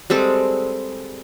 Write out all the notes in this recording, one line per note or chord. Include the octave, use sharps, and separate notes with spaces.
G3 G#3 C4 A4